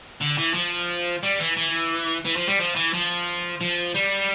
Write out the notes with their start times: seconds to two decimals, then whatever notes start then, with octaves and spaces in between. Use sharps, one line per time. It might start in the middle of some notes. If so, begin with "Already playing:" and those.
0.21 D3
0.38 E3
0.54 F3
1.23 G3
1.40 E3
1.57 E3
2.25 E3
2.36 F3
2.48 G3
2.59 F3
2.75 E3
2.93 F3
3.61 F3
3.94 G3